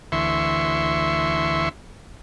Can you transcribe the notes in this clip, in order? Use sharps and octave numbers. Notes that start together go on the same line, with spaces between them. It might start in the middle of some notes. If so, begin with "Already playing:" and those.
D2 E3 E5 C6 C#6